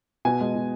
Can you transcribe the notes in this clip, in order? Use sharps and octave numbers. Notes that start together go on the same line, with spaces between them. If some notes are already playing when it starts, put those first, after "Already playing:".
B2 G#5
G#3
B2